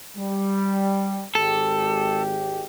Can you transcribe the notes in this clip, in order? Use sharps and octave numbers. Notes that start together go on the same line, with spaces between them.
G3
G#1 G#3 G4 A4